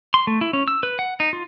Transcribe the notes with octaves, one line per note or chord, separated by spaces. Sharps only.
C6
A3
E4
C#4
E6
B4
F#5
D#4
F4